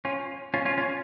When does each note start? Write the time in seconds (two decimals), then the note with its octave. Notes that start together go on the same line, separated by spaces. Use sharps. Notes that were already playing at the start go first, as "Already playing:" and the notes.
0.05 C#4 F4
0.54 C#4 F4
0.65 C#4 F4
0.78 C#4 F4